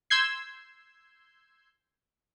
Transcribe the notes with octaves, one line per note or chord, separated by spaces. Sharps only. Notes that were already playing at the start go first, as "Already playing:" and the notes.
C6 E6 G6 G#6 C7